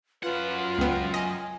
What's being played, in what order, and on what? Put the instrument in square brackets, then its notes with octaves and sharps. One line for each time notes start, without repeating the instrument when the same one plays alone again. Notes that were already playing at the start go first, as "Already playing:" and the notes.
[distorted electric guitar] F#2 F#5 [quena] F4 [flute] B4
[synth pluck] C#2 B3 [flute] G5
[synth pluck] D#5 [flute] G#5